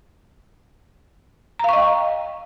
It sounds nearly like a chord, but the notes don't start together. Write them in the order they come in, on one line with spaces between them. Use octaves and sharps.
A#5 F5 C#6 D#5 G5